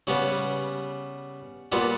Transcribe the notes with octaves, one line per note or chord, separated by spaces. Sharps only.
C#3 G3 B3
A#2 G3 B3